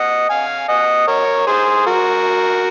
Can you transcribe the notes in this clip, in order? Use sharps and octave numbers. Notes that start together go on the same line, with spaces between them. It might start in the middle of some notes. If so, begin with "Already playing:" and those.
Already playing: D#5 F#5
F5 G#5
D#5 F#5
A#4 C#5
G#4 C5
F#4 A#4